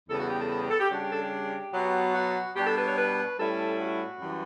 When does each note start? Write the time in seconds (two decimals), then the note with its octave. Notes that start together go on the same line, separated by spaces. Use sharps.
0.07 E2 C#3 G3 B3 A4
0.18 F#4
0.28 G4
0.38 A4
0.49 A4
0.59 G4
0.69 A4
0.79 G4
0.90 C#3 G3 D4 F#4
1.00 G4
1.10 A4
1.20 G4
1.72 B2 F#3 B3
2.13 F#4
2.54 B2 G3 D4 G4
2.65 A4
2.75 B4
2.85 C#5
2.95 B4
3.36 A2 G3 C#4 E4 A4
3.77 F#4
4.19 F#2 E3 G3